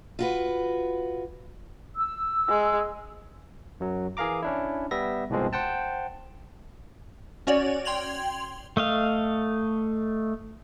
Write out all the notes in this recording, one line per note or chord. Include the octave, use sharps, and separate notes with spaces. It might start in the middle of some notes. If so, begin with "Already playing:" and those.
F4 F#4 B4
E6
G#3
F#2 F#3
E3 G#4 A#4 F5 A#5 D6
C#4 D4 E4
G3 B3 E5 A#6
C2 G#2 B2 F3 G#3 C4
C5 F#5 G5 A5
C#4 F#4 C#5 D5
G5 C6 G#6 F7 F#7
A3 D#5 F5